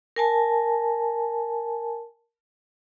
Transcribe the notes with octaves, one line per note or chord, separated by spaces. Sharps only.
A#4 G#5 A5